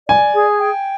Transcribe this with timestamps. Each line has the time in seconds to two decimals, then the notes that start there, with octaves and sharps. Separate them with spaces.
0.08 D5 G#5
0.34 G#4
0.59 G5